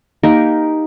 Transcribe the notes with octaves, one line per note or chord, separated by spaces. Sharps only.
A#3 D#4 G4 A#4